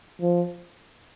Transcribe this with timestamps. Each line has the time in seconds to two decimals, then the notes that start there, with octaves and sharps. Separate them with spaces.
0.21 F3